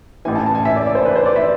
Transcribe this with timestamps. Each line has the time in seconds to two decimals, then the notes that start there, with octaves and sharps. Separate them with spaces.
0.25 A1 A2 E3 G#5
0.35 A5
0.46 A5
0.55 G#5
0.65 E5
0.76 D5
0.86 D5
0.95 C5
1.05 B4
1.16 C5
1.26 D5
1.36 E5